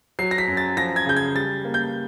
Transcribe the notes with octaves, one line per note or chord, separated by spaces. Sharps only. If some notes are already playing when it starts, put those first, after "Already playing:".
F#3 C7
A#6
B6
F#2
A6
F3 A#6
G#6
C#3 G6
G#6
G3 A6
A#3
G6